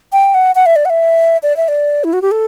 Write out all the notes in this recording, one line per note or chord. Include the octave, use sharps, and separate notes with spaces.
G5
F#5
F#5
E5
D5
F#5
E5
D5
E5
D5
E4
F#4
G4
A4